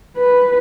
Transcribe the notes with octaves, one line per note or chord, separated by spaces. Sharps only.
B4